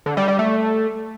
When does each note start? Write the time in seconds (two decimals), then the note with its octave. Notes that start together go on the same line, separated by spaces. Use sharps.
0.06 D3
0.17 G3
0.28 G3
0.39 A3